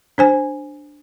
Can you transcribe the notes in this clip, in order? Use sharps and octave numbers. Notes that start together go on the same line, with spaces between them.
D4 C5 G#5